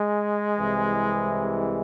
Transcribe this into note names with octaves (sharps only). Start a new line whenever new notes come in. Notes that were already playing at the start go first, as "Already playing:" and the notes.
Already playing: G#3
C2 C3 E3